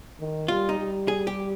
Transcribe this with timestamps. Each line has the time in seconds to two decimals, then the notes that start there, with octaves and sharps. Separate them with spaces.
0.20 D#3
0.48 G3 F4
0.69 D#4
0.79 G3
1.08 G#4
1.27 G4